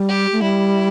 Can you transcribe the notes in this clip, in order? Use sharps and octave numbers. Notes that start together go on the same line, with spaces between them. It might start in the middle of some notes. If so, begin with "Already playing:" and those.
Already playing: G3
G4
A3
G3 E4